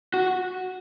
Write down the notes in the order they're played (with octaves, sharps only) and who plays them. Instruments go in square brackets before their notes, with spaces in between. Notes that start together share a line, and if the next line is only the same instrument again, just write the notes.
[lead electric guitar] F#4